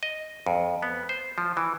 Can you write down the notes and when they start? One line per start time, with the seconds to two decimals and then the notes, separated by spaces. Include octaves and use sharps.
0.03 D#5
0.46 F2
0.82 B3
1.09 C5
1.38 F3
1.57 E3